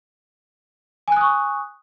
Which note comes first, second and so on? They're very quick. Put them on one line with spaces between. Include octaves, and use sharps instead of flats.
G#5 F#6 D#6 C#6